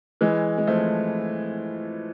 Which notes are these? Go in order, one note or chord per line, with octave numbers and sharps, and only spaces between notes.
E3 G#3
G#3
F3 A3